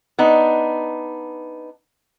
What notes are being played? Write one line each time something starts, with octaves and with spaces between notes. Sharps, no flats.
B3 D4 D#4